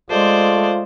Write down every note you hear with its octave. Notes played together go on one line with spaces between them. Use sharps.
G#3 A3 F4 C5 D5